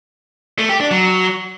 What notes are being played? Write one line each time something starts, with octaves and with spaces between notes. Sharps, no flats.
A3
G4
D4
F#3